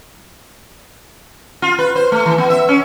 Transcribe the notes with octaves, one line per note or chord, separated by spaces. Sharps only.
F4
B4
C5
A3
E3
B3
E5
C#4